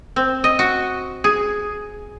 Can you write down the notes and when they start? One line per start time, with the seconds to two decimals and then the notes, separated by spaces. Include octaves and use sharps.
0.16 C4
0.44 D#5
0.59 F#4
1.24 G#4